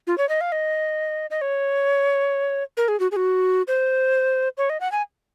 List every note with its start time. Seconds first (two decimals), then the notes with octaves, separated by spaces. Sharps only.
0.07 F4
0.18 C#5
0.29 D#5
0.41 F5
0.52 D#5
1.30 D#5
1.41 C#5
2.77 A#4
2.88 G#4
3.00 F#4
3.11 G#4
3.16 F#4
3.67 C5
4.57 C#5
4.69 D#5
4.80 F#5
4.92 G#5